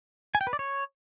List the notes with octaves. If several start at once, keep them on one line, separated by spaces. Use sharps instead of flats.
G#5
G5
B4
D5
C#5